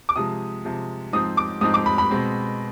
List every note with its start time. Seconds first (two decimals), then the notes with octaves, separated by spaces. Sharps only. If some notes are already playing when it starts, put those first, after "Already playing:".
0.09 D6
0.16 C3 F3 G#3 D#6
0.65 C3 F3 G#3
1.13 G#2 F3 C4 D#4 D#6
1.37 D6
1.61 G#2 F3 C4 D#4 D#6
1.74 D6
1.86 B5
1.98 B5
2.11 B2 G#3 C4